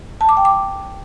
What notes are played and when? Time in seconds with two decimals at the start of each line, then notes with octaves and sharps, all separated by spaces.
0.21 A5
0.29 D6
0.37 G5
0.45 D6